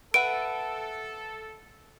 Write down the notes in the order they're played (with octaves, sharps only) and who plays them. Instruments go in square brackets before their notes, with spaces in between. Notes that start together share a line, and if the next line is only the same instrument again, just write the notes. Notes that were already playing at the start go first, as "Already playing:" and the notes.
[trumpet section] A4 [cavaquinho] B4 E5 F#5 [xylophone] D7